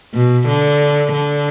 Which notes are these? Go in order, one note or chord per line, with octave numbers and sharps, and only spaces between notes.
B2
D3
D3